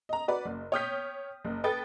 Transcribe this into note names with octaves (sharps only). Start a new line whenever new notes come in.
D#5 A#5
F#4 B4 D5
F#1
C#5 G5 D#6 F6 G6 B6
F#1
A4 B4 G5 D#6 A6